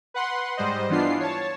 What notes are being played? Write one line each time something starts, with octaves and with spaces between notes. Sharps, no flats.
B4 F#5 C6
G#2 G3 C5 D#5
E3 B3 D4 F4 C7
C#5 A5